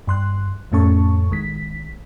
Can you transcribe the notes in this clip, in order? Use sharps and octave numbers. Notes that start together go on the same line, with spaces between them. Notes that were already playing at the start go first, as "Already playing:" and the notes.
G2 C6 F#6
F2 A2 A3 C#4 A5 C#6
A1 D#3 G#3 B6